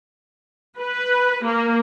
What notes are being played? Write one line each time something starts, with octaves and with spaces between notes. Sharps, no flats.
B4
A#3